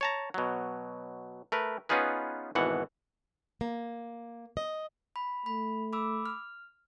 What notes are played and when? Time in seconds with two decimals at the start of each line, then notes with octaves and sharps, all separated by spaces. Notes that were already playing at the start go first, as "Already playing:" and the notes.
0.01 C#5 A5 A#5
0.34 B2 F#3
1.52 A3 A#4 B4
1.89 B3 C#4 D#4 F4 G#4 B4
2.55 G#1 B2 E3 F#5
3.61 A#3
4.57 D#5
5.16 B5
5.46 A3 B5
5.93 B5 D6 E6
6.26 F6